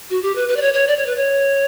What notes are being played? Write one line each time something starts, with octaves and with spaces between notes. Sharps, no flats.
F#4
G4
B4
B4
D5
C#5
C#5
D5
C#5
B4
C#5